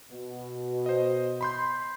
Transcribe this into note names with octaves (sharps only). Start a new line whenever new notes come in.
B2
C5 D#5
B5 C6 G6